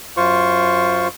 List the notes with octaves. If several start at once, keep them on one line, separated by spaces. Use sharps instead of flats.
F#2 F4 C5 C#6